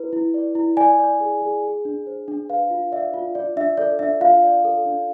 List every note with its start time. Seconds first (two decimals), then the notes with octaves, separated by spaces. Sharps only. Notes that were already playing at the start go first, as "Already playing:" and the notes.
Already playing: E4 B4
0.13 E4
0.34 D5
0.55 E4
0.77 D5 G#5
0.99 D5
1.20 G#4
1.42 G#4
1.64 G#4
1.85 D4
2.07 C5
2.28 D4
2.49 B4 F5
2.70 F4
2.92 D5 E5
3.14 F4
3.35 F4 D5
3.56 D4 E5
3.77 A4 D5
3.99 D4 E5
4.21 F4 F5
4.43 D5
4.65 A4
4.85 D4